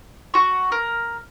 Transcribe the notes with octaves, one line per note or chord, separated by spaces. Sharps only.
F#4 C#6
A#4